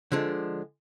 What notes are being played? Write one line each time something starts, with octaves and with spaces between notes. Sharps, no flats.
D3 F3 G#3 D4